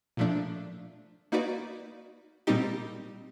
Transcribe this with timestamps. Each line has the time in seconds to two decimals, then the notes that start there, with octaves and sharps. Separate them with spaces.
0.17 A#2 F3 A3 D4
1.32 A#3 D#4 F#4 B4 D5
2.47 A#2 G3 C4 D#4 G4